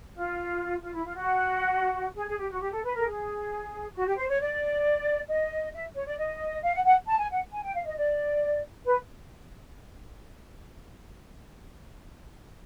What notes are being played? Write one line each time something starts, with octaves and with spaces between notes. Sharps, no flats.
F4
F4
E4
F4
F#4
G#4
G#4
G4
F#4
G4
A4
B4
A4 A#4
G#4
F#4
G4
C5
C#5
D5
D#5
E5
C#5
D5
D#5
F5
F#5
F#5
A5
G#5
F#5
G#5
G5
F5
D#5
D5
B4